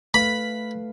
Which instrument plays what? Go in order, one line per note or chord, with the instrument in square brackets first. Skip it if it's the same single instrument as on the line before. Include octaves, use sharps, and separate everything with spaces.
[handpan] A3 B4 F5 [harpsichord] B5